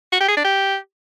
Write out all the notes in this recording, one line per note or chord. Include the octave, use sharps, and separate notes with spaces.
F#4
G4
G#4
D4
G4